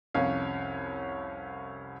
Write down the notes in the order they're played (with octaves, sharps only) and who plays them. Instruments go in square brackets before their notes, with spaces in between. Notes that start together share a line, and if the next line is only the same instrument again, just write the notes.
[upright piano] C2 F2 C#4 C#5 F5